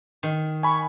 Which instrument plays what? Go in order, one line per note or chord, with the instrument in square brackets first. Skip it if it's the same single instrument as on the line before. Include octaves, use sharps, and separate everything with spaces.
[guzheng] D#3
[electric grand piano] G#5 B5 [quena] C#6